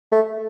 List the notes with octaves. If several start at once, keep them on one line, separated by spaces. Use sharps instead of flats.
A3